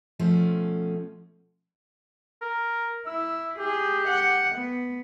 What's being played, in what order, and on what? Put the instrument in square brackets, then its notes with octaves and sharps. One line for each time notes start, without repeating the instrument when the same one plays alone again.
[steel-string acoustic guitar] B2 F3 A3 C#4
[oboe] A#4
[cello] E4 [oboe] E6
[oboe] G4 [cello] G#4
[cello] F#5
B3